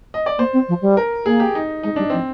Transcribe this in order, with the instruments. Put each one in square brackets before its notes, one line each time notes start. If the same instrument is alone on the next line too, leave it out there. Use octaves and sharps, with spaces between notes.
[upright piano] D#5
D5
[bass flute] A#3 [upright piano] C5
[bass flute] C4
F3
G3
[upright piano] A#4
[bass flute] A#3 [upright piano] G#4
[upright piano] G4
D#4
[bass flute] G#3 [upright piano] D#4
[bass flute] G3 [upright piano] D4
[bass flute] F3 [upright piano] C4